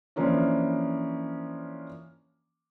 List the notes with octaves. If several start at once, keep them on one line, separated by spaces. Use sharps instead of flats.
E3 F3 A#3 C#4 D4